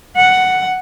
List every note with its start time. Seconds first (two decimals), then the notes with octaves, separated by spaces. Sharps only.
0.17 F#5